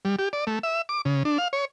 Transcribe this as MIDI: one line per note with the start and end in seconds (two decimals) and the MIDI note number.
0.05 0.16 55
0.19 0.29 67
0.33 0.45 74
0.47 0.59 57
0.63 0.82 76
0.89 1.01 86
1.05 1.23 49
1.25 1.38 62
1.38 1.48 77
1.53 1.65 73